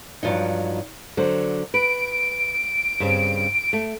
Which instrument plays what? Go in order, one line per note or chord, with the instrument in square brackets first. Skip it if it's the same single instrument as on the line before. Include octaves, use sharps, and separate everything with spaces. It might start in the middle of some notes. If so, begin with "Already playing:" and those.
[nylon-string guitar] G2 F3 F#3 D#4
D3 F#3 C5
[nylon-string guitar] B4 [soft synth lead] D7
[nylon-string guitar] G2 C#3 C4
A3